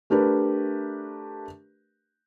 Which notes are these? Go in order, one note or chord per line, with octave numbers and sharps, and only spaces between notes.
A3 D4 G4 A#4 B4